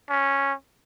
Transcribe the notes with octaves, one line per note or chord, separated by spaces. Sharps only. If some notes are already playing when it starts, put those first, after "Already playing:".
C#4